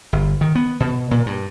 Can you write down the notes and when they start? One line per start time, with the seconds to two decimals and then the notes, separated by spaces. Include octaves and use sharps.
0.13 G1
0.41 D#3
0.55 B3
0.80 B2
1.11 A#2
1.26 G2